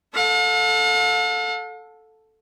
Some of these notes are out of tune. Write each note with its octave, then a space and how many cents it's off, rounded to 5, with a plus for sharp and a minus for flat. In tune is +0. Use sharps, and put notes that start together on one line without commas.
A4 +0 F5 +45